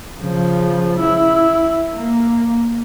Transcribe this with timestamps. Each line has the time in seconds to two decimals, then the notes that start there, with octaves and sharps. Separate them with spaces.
0.20 C#3 F3
1.00 E4
1.95 A#3